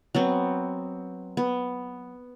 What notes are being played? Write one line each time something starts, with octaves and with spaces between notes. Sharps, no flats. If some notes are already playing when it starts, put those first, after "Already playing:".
F#3 B3 C4
B3